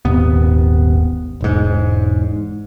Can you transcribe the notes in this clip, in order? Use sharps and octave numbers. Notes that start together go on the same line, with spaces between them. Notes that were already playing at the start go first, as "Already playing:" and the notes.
D#1 G#1 D#2 B3
E1 G#2